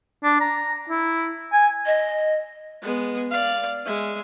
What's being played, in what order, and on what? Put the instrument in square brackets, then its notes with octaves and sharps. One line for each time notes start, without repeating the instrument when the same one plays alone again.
[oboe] D4
A#5
E4
G#5
[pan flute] D#5
[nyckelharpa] G#3 B3
D5 F5
G#3 E5